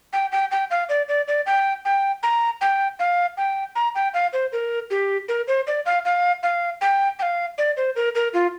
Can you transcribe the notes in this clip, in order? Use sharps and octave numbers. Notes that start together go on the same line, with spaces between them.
G5
G5
G5
F5
D5
D5
D5
G5
G5
A#5
G5
F5
G5
A#5
G5
F5
C5
A#4
G4
A#4
C5
D5
F5
F5
F5
G5
G5
F5
D5
C5
A#4
A#4
F4